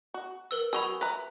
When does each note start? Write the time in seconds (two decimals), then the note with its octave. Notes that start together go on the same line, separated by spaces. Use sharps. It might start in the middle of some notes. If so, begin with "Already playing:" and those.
0.14 F#4
0.51 A#4 B4 E6
0.73 F#3 G#4 B5 C#6 E6
1.01 B4 E5 A#5 F#6